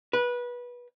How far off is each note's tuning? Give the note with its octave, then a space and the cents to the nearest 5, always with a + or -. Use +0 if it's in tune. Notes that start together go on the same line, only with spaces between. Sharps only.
B4 -20